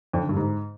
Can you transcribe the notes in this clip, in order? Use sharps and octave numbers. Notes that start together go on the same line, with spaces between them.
F2
D3
G2
G#2